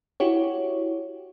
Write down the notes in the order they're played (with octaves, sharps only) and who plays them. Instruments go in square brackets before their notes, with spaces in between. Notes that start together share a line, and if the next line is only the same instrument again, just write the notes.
[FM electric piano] E4 F#4 G4 C#5